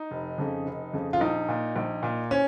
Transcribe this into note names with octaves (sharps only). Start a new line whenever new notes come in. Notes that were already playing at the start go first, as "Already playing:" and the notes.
Already playing: D#4
F1
F2 C#3
F1
F2 C#3
F4
A#1 D#4
A#2
A#1
A#2
C#4